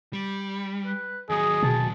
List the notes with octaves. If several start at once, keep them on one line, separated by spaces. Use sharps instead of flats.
G3
B4
D#2 F#3 G#4 D#5
B2 A5